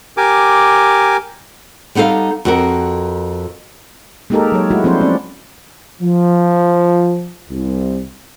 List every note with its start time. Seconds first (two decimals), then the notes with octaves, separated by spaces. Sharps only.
0.17 G4 A#4 G#5 D6
1.95 G3 B3 D#4 A4 F5
2.45 F2 F#4 A#4
4.30 G#3 A#3 D#4 G4 A4 A#4
4.52 F#3 C#5
4.70 G#3 A3 E4 F#4
4.84 F3 C4 D4 E4 F#4 C5
4.99 C4 C#4 D5
6.01 F3
7.50 C2